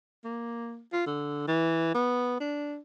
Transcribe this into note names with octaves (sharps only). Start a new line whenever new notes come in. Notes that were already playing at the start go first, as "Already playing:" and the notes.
A#3
F4
D3
E3
B3
D4